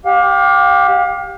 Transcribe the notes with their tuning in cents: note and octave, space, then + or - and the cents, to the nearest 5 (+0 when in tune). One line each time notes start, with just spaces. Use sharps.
G4 +0 F5 +30